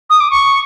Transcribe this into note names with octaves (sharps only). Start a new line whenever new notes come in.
D#6
D6
C#6